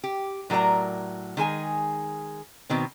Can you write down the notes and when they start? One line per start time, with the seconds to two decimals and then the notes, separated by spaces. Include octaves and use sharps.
0.04 G4
0.50 A2 F#3 A#4 D5 A#5
1.37 D#3 G#3 G#4 G#5
2.69 B2 D#3 C4